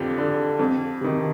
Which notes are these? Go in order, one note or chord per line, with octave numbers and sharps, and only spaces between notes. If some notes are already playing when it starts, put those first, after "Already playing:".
Already playing: F2 D3 F4 G4
D3
F2
C3 D#3